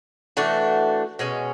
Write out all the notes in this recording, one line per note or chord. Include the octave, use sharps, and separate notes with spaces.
E3 A3 D4 F#4
B2 G#3 C#4